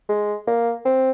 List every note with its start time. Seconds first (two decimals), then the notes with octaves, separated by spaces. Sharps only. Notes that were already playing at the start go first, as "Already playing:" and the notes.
0.09 G#3
0.47 A#3
0.85 C4